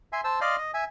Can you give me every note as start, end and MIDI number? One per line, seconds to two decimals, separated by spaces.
0.13 0.21 76
0.13 0.21 80
0.13 0.21 84
0.24 0.40 72
0.24 0.40 81
0.24 0.40 88
0.41 0.56 74
0.41 0.56 75
0.41 0.56 77
0.41 0.56 84
0.58 0.71 75
0.74 0.84 76
0.74 0.84 80